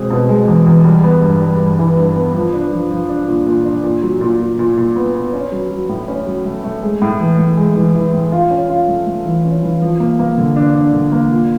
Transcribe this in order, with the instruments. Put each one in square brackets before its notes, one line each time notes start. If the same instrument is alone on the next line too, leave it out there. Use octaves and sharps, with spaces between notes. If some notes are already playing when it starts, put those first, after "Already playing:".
Already playing: [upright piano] B2 G#3 C4
B2
G#3
E2
E2
G3
B3
G2
G3
G2
E3
G2
B3
F3
D4
F3
F3
D4
A#2
A#2
D4
A#2
F#3
A#2
A#2
A#2
A#2
B3
B3
C#4
F#3
F#3
A2
C#4
F#3
A3
A3
G#3
A2
E3
A2
G#3
E3
E3
A2
F4
C#4
F4
A3
A3
E3
C#4
E3
F3
A#3
A#3
D3
D4
D4
D3
A#3
A#2